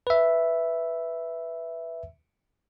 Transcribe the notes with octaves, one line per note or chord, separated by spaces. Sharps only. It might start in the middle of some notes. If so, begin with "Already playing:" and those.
B4 E5